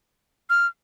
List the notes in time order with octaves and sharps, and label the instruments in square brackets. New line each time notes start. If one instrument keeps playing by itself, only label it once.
[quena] F6